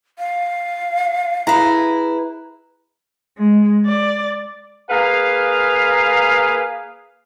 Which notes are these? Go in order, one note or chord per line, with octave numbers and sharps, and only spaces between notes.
F5
E4 G#4 B4 A#5
G#3
D5
A#3 G#4 B4 F5